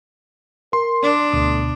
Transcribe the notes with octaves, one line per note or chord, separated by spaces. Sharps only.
A#4 C6
D4
D2 B2 A3 D#6